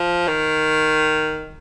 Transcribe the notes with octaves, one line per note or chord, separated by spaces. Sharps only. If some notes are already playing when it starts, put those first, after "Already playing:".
Already playing: F3
D#3